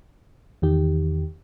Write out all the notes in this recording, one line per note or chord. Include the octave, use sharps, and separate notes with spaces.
E2 D#3 G4